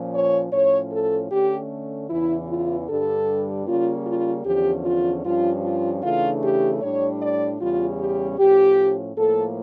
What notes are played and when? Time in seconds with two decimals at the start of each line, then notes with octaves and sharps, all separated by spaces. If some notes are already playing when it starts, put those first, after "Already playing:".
Already playing: A#2 F3 C#4
0.13 C#5
0.52 A2 F3 C#4 C#5
0.91 A4
1.30 D3 A3 C#4 G4
2.09 E2 C#3 E3 E4
2.48 F4
2.88 G2 D3 G3 D4 A4
3.67 C#3 G3 A#3 C#4 F4
4.06 F4
4.44 E2 D3 F3 C#4 G4
4.84 F4
5.24 G2 F3 C#4 F4
5.63 F4
6.02 C#3 E3 A3 D4 F4
6.42 G4
6.81 A2 G3 D4 C#5
7.21 D5
7.60 E2 C#3 G3 C#4 F4
7.99 G4
8.38 A2 F3 C#4 G4
9.17 A2 F3 A#3 A4